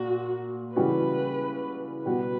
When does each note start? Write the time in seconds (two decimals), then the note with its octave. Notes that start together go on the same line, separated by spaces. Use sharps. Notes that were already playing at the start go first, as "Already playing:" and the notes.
Already playing: A#2 F#4
0.76 C#3 E3 G3 C#4 F#4 B4
2.05 B2 G3 B3 F#4 B4